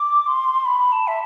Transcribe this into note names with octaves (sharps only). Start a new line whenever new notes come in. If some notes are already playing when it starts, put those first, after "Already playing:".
Already playing: D6
C6
B5
A5
E5